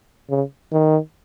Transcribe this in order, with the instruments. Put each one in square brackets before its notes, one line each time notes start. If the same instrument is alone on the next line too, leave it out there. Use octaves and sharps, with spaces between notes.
[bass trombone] C#3
D#3